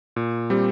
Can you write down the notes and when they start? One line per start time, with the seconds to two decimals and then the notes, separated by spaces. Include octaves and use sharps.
0.16 A#2
0.50 G3 C4 G4